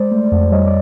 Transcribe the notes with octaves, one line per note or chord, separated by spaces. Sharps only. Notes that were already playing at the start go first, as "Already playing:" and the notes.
Already playing: G#3 C5 D5
A3
F2
G3 C#5 D#5
D5